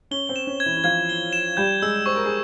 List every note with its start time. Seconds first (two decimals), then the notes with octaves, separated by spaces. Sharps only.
0.11 C#4 G7
0.29 C4
0.36 E7
0.47 C#4
0.60 G#6
0.66 E3 E4
0.77 E4
0.84 F3 F4 G#6
1.09 G7
1.33 E7
1.57 G3 G4 G6
1.82 G#3 G#4 E6
2.06 C5 C#6
2.16 A#4
2.26 G#4